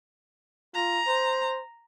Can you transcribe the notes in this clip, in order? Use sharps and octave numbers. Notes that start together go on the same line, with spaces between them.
F4 A#5
C5